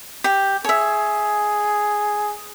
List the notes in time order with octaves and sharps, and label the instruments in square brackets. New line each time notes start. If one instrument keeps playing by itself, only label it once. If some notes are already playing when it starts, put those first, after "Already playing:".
[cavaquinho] G4
[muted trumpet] G#4 [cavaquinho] C#5 E5